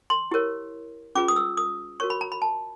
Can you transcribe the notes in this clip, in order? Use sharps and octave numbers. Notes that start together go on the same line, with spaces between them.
C6
E4 G4 A#4 C#5
C#4 F4 G#4 B4 D6
D#6
E6
D#6
F#4 A#4 C#5 C#6
B5
A#5
B5
A5